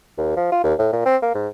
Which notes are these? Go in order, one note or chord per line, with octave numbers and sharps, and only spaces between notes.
D#2
F3
F4
D#2
A2
A#2
C4
A#3
G#2